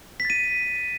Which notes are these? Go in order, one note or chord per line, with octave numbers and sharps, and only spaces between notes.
B6
A6
D#7